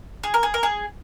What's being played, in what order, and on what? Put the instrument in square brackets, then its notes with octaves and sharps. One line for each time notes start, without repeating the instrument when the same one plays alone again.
[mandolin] G#4
A#4
G#4
A#4
G#4